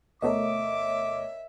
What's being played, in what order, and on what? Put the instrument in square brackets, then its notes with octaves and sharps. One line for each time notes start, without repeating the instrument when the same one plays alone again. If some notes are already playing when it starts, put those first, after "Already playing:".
[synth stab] D2 B2 A3 [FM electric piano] A#4 C#5 D#5 [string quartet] E5 [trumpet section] D6